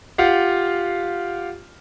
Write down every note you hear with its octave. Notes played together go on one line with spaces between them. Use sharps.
F4 G4 F5 F#5